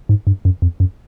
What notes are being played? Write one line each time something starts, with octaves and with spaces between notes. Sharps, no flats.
G#2
G2
F#2
F2
F#2